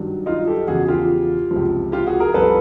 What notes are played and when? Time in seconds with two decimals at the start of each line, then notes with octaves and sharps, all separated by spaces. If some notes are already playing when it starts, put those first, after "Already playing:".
Already playing: G2 D#3 F#3
0.26 D#4 F4
0.47 G4 A4
0.67 E2 C#3 F3 F#4 G#4
0.88 F4 G4
1.51 C#2 C3 F3
1.92 F4 G4
2.07 F#4 G#4
2.20 G#4 A#4
2.34 C2 C3 F3 A4 B4